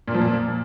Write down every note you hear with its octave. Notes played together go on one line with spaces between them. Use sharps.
A#2
F3
A#2